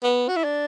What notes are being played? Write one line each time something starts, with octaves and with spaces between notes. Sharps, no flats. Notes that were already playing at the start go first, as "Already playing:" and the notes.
B3
F#4
E4
D4